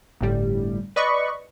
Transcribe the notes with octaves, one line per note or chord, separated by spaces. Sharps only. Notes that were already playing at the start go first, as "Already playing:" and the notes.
G1 A2 G3
B4 D5 D#5 B5 C#6